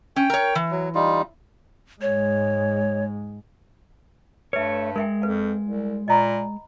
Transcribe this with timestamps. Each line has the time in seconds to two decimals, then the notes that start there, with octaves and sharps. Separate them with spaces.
0.16 C#4 G5
0.30 A#4 C#5
0.55 E3
0.71 F#3
0.95 G3 D#4 F4
2.02 G#2 G#3 C#5
4.53 G2 A3 B4 C#5 E5
4.96 G#3 A#4 E5 G5
5.22 F2 B4 F5
5.63 C2
6.08 A#2 D#5 A#5 B5